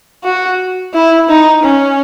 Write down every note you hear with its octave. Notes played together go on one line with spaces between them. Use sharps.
F#4
E4
D#4
C#4